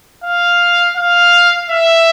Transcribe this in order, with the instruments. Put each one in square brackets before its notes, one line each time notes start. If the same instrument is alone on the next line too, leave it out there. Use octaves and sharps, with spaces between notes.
[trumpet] F5
F5
E5